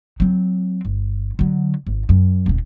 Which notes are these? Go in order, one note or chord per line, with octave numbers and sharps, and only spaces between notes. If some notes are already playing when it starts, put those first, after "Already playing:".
F#3 C4
G1
D3 F#3
G#1
F#2
D#1 C#3